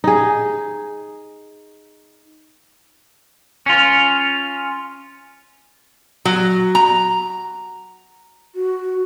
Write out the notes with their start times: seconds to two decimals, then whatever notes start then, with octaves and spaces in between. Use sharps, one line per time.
0.04 D#4 G#4
3.66 C#4 F4
6.25 F#3
6.75 A#5
8.55 F#4